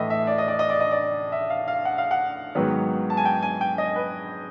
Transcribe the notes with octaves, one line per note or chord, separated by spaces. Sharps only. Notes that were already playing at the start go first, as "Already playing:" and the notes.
Already playing: A2 E3 A3 D#5 E5
E5
D5
D#5
D5
D#5
D5
D#5
D5
E5
F5
F5
F#5
F5
F#5
G#2 D#3 F#3 B3
A5
G#5
G5
G#5
G5
D#5
B4